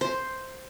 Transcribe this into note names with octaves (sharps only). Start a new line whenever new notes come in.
C5